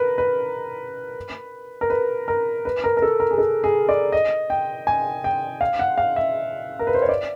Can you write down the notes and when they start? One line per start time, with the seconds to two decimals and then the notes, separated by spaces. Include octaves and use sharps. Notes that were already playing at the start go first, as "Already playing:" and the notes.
Already playing: A#4 B4
0.18 B4
1.81 A#4
1.90 B4
2.28 A#4
2.65 B4
2.84 A#4
2.97 A#4
3.02 A4
3.20 A#4
3.31 G#4
3.38 A4
3.64 G#4
3.89 D5
4.12 D#5
4.50 G5
4.87 G#5
5.24 G5
5.61 F5
5.79 F#5
5.98 F5
6.16 E5
6.79 A#4
6.87 B4
6.94 C5
7.02 C#5
7.09 D5